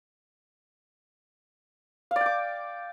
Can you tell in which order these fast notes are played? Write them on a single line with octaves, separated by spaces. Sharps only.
F5 D5 G5 D6